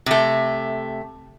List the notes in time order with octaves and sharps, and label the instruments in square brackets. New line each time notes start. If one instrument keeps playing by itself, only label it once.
[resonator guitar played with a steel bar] C3 A3